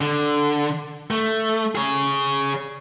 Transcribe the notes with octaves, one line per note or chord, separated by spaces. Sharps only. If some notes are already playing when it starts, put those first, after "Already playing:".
D3
A3
G#4 C#5